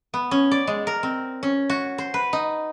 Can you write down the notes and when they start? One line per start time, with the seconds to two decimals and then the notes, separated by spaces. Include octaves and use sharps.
0.14 B3
0.31 C#4
0.51 D5
0.67 G#3
0.87 A#4
1.03 C4
1.43 C#4
1.70 F#4
1.98 C5
2.14 B4
2.33 D#4